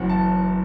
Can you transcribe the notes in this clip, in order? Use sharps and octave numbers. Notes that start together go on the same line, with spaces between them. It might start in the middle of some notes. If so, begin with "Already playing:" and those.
Already playing: F#1 F#2 E3 F#5
A5